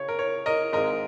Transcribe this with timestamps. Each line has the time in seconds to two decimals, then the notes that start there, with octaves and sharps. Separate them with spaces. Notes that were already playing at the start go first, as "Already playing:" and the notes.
Already playing: C#3 C#5
0.08 A#4
0.19 C#5
0.46 A#4 D#5
0.73 G#1 G#2 G#3 A#4 D#5